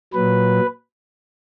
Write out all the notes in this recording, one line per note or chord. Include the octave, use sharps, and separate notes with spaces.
A#2 F#3 B4